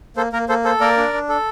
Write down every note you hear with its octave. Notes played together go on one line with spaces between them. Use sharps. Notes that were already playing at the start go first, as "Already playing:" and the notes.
A#3 A4 C5
A#3 A#4
A#3 A4 C5
A4 C5
A#3 A#4 D5
D4
D4
A4